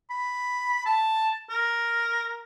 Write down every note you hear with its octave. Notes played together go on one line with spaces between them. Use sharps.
B5
A5
A#4